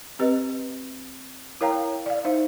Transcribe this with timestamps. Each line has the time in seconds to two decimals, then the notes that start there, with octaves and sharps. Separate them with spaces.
0.19 C4 G4 B4 D#5
1.61 E4 A#4 C#5 F5 G5 A#5
2.06 D5 F5
2.25 D#4 C5 E5